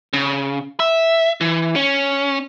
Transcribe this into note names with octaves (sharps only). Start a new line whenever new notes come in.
C#3
E5
E3
C#4